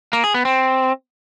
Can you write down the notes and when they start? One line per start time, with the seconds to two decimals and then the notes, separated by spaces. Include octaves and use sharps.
0.13 A#3
0.24 G#4
0.34 B3
0.45 C4